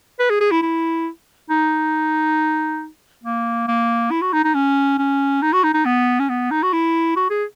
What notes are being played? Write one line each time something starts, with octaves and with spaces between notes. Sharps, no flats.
B4
G#4
G#4
E4
E4
D#4
A#3
A#3
E4
F#4
D#4
D#4
C#4
C#4
D#4
F#4
D#4
D#4
B3
C#4
B3
D#4
F#4
E4
F#4
G#4